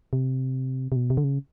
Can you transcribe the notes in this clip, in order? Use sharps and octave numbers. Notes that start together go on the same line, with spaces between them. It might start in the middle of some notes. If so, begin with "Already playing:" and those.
C3
C3
B2
C3
D3
C#3